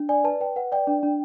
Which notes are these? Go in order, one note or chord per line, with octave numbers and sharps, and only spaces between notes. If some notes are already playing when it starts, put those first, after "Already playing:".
Already playing: D4
D5 G#5
B4 A5
B4 G5
B4 F#5
D5 G5
D4
D4